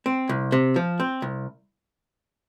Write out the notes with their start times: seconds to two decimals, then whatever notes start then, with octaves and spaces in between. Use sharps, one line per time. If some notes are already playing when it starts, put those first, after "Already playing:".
0.06 C4
0.29 C2
0.52 C3
0.76 F3
1.00 C4
1.22 C2